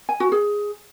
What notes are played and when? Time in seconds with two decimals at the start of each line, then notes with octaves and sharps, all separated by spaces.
0.09 G#5
0.20 F#4
0.32 G#4